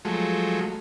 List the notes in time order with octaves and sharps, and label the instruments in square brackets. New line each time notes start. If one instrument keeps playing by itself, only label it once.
[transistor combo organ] F3 F#3 G#3 A3